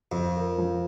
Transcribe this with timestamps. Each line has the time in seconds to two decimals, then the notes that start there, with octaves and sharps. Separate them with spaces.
0.12 F2 F4
0.36 A#4
0.58 F3